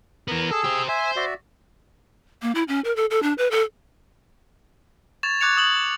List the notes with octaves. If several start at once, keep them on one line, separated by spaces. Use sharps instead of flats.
E3 B3 A#4
G#4 A4 E6
G4 C5
C5 E5 G#5
F#4 D5 E5
A#3
E4
C#4
A#4
A4
A4
D4
B4
A4
C#6 G#6 A6 E7 F7
C#6 D6 F#6 G#6 C#7 F7
D#6 G#6 F#7